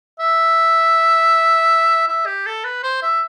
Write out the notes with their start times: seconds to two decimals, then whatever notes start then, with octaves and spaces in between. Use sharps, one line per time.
0.19 E5
2.08 E5
2.26 G4
2.46 A4
2.64 B4
2.83 C5
3.02 E5